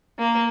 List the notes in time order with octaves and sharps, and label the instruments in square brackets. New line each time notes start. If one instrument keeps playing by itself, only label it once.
[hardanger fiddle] A#3